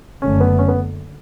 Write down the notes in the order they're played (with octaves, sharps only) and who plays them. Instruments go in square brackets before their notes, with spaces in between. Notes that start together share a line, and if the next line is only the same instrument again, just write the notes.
[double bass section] F#1 F#2 D3 A3 [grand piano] C#4
[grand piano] B3
C#4
B3